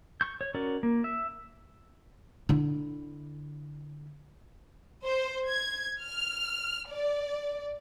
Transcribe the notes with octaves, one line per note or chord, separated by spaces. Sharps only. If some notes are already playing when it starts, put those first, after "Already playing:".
C#6 G6
C#5
C#4 F#4 A#4 D5
A#3
E5
D3 E4
C5
G#6
F6
D5